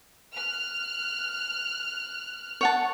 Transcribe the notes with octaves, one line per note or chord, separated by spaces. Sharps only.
F6 F#6
C#5 F#5 A5